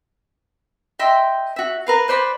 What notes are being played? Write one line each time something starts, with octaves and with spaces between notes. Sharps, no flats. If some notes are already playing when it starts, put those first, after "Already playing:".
D#5 E5 G5 C6
F#4 E5
A#4 B4 F5
B4 C5 D5 B5